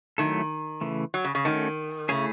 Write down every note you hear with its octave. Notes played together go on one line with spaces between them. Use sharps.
D#3 F#3 A3 E4 A4
C#3 E3 A3
F#3
C#3
C#3
D#3 A3 C#4 F#4 A4
C#3 A3 E4 G#4 C#5